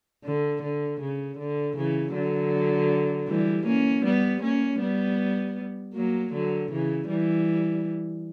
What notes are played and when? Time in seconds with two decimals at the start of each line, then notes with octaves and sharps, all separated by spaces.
0.24 D3
0.62 D3
1.00 C#3
1.38 D3
1.76 C#3 E3
2.13 D3 F#3
3.27 E3 G3
3.66 A#3 C#4
4.04 G3 B3
4.42 A#3 C#4
4.80 G3 B3
5.94 F#3 A#3
6.33 D3 F#3
6.71 C#3 E3
7.08 E3 G3